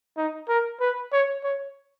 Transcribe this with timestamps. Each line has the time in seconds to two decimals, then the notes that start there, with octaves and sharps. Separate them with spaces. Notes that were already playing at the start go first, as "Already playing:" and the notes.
0.17 D#4
0.49 A#4
0.81 B4
1.12 C#5
1.44 C#5